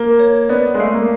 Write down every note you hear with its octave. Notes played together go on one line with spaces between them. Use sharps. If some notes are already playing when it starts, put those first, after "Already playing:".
Already playing: A#3 A#4
C#5
B3 D5
G#3
A3 F5
A#3